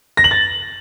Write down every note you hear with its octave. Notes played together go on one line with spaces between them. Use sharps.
A#6
F#7
A6